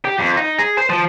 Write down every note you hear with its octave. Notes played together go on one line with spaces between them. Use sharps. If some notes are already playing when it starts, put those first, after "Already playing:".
G4
F2
D#4
G#4
C5
F3